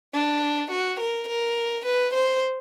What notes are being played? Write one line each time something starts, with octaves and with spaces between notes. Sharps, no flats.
D4
F#4
A#4
A#4
B4
C5